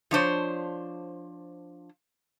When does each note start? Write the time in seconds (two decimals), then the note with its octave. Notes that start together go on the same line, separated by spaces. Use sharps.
0.11 F3 D4 C5 C#5